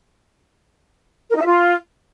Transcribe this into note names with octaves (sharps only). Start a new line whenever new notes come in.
A#4
D#4
E5
F4